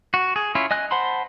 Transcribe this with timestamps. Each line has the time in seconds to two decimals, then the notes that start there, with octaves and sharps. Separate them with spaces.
0.14 F#4
0.36 G#4
0.55 C#4 E4 F4
0.71 D#5 G#5 F#6
0.91 C5 F#5 A5 B5 C6